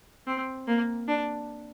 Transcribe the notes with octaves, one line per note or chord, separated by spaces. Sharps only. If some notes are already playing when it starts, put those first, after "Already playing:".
C4
A#3
D4